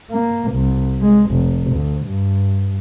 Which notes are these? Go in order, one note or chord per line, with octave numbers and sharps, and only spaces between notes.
A#3
C2
G#3
F1
D2
G2